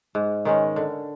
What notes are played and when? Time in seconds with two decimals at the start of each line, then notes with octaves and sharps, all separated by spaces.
0.15 G#2
0.45 D#3 G#3 C#4
0.76 D3